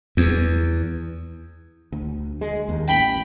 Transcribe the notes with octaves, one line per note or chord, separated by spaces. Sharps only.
E2
D2
G#3
D#2
A1 G5 B5